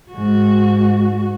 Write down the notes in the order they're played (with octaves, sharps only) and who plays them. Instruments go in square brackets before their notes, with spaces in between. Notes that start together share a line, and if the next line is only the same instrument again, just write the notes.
[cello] G#2 F#4